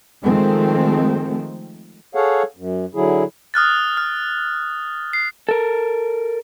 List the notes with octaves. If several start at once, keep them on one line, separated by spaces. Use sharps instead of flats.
D#3 F3 G#3 A3 C4
G#4 A4 C#5 F5 F#5
F#2
D3 F#3 E4 G#4
D#6 F6 F#6 A6
F6
C7
A4 A#4